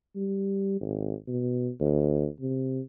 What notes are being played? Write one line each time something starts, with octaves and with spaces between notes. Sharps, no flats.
G3
G#1
B2
D2
C3